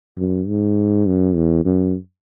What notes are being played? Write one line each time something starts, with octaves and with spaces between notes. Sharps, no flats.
F#2
G#2
F#2
E2
F#2